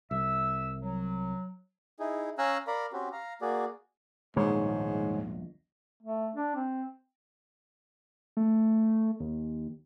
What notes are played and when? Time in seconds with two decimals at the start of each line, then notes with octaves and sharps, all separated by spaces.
0.11 C2 E5 E6
0.82 F#3
2.00 D#4 E4 G#4
2.38 C#4 F5 G#5 A#5 E6 F#6
2.67 A#4 D5 F5 A#5 B5
2.93 C4 C#4 F#4 G4
3.12 F5 A#5
3.41 A#3 F#4 G#4 D5
4.36 D#1 A#1 G#2 B2 D#3 G#3 C#5
6.03 A3
6.35 D4
6.55 C4
8.37 A3
9.20 D#2